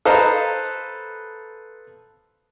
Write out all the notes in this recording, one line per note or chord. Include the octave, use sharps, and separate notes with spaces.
A4 B4 C5 D#5 F5 A#5